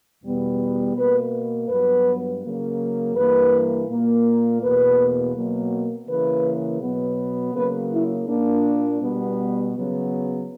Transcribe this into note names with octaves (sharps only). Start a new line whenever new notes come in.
E2 B2 G3 B3
B2 A#3 B4
G2 F#3 B3 B4
C#3 F#3 A#3
G2 E3 A#3 B4
A#2 A#3
E2 B2 A#3 B4
B2 F#3 A#3
C#3 E3 A#3 B4
B2 F#3 B3
C#3 F#3 A#3 B4
E4
A#2 A#3 D4
B2 G3 B3
C#3 F#3 B3